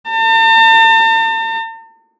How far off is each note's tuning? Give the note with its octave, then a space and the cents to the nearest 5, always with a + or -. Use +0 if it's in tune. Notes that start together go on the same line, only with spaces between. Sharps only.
A5 +45